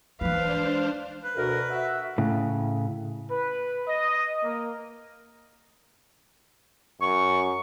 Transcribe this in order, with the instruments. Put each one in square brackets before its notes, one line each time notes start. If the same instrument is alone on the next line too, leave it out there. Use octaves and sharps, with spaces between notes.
[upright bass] E3 G#3 [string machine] D4 C5 [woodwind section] B4 [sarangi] F5
[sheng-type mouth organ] B4
[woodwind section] D2 B2 A#4
F#4 E5
[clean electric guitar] A2 C#3
[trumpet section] B4
D#5
A#3
[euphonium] F#2 [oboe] C#6